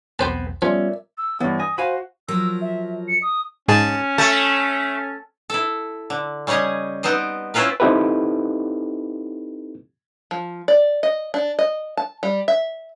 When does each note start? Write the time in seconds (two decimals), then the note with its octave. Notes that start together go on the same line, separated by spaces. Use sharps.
0.19 B1 E2 B3 C4 G4 B4 C5 A5
0.62 F3 G3 B3 C#4 F4 A#4 D5 E5
1.18 E6
1.40 G2 E3 B3 C#5
1.60 G#5 D#6 A#6
1.78 F#4 C5 F5 G#5 B5
2.28 F3 F#3 A#4 E6
2.61 E5
3.08 C#7
3.22 D#6
3.68 G#2 C#4 G#4 A5
4.18 A3 A5
5.50 E4 A4
6.10 D3
6.47 C#3 G3 G#4 C#5 D#5
7.03 B3 C4 D#4 C5 D#5
7.54 C4 C#4 E4 F4 A#4 B4
7.80 C4 D#4 E4 G4 A4 B4
10.31 F3
10.68 D5
11.03 D#5
11.34 D4
11.59 D#5
11.97 A5
12.23 G3
12.48 E5